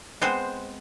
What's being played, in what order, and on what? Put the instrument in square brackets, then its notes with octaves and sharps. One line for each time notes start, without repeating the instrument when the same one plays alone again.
[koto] G#3 B3 C4 C5